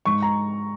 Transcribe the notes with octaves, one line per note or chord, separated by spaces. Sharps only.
G#2 C#6
A#5